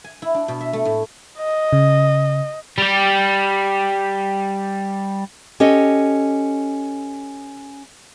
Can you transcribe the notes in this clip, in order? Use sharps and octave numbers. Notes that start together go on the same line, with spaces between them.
G#5
E4
D4
B2
E5
A3
A2
D#5
C#3
G3 G4
C#4 G4 A4 D#5